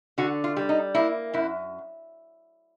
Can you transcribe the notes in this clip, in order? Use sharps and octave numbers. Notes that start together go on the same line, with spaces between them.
D3 F#4
F4
G3
D#4
A#3 E4
F#2 E4